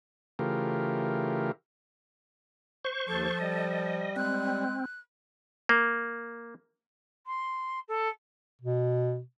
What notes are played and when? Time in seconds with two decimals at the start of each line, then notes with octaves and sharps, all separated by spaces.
0.39 C#3 E3 A3 F4 G4 A#4
2.85 C5 C#6
3.08 D#2 F3 A4
3.39 G3 D#5
4.16 G#3 C4 F#6
5.69 A#3
7.26 C6
7.88 A4
8.62 B2